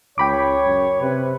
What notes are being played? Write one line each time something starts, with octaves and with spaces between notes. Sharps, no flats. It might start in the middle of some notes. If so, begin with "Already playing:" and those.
C#2 C#5 G5 B5 D6
F#2
C3 B4